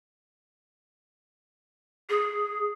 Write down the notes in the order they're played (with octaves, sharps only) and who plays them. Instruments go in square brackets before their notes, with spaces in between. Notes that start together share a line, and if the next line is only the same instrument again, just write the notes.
[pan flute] G#4